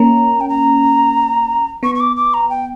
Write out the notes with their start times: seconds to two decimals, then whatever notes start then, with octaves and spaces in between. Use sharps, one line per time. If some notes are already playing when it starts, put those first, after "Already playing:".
Already playing: A#3 C#4 A#5
0.41 G5
0.49 A#5
1.83 B3 C#6
1.95 C#6
2.00 D6
2.16 D6
2.34 A#5
2.50 G5